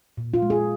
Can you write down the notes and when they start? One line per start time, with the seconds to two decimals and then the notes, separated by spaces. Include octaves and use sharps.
0.18 A#2
0.34 F4
0.42 G#3
0.50 G#4